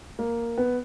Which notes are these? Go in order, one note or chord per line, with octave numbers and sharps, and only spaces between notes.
A#3
B3